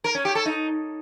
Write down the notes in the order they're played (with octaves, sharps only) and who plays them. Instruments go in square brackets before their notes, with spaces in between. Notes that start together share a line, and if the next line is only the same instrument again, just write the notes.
[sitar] A#4
C#4
G4
A4
D#4